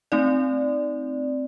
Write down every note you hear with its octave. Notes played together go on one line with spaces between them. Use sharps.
A3 C4 D#4 D5